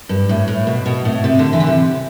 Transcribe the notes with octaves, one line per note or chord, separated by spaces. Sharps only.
G2
A2
A2
B2
B2
A2
C3
D3
E3
D3
C3